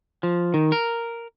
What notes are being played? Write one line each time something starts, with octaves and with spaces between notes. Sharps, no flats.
F3
D#3
A#4